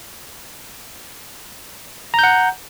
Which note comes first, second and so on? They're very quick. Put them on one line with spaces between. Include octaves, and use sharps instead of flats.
A#5 G6 F#5